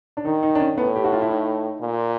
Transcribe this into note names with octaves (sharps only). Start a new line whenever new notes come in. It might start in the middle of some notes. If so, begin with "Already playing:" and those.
D4
D#3 D#4
D#4
D4
C#4
A2 B3
G4
F#4
F4
E4
D#4
A#2